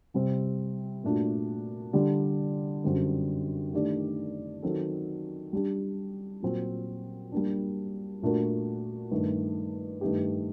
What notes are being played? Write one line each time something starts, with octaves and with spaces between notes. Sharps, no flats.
C3 G3 C4
A#2 A3 D4 F#4
D3 G3 D4 G4 D5
F#2 D3 G3 C4 F#4
D#3 A3 D4 G4 D5
D#3 F#3 C4 F#4 A4
G3 D4 G4
A#2 F#3 C4
G3 A#3 D4
A#2 A3 D4 F#4 A#4
G2 D#3 A3
G2 D#3 A3 D#4 G4